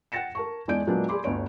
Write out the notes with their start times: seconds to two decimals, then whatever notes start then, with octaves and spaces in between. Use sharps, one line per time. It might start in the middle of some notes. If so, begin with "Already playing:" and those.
0.12 F#5 G5 A6 A#6 C#7 E7
0.35 A#4 A5 C#6
0.68 E2 G#3 D4 D5 G6 D7
0.87 A#2 F#3 G#3 A#3 B3 D4
1.09 G#4 D5 B5 C6 D6
1.24 G1 D2 G2 C#5 D7